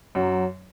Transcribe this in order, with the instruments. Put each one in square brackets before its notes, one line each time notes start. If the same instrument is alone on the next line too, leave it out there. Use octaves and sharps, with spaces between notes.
[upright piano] F#2 [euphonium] F#3